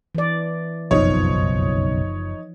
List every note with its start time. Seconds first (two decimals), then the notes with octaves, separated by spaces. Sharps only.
0.15 E3 D5
0.91 F#1 B1 F2 C#3 F3 D#4 C#5